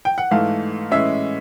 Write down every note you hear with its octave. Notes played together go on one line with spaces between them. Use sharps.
G5
F#5
G#2 E3 A3 F5
A2 E3 G#3 C#4 E5